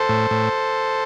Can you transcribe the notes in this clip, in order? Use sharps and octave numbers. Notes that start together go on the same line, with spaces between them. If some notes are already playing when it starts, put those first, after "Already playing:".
Already playing: A4 C5
A2
A2